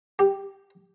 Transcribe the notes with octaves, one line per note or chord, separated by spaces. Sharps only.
G4